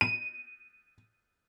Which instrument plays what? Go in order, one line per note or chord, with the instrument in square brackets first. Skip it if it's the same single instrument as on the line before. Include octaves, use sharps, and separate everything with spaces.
[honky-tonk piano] D#7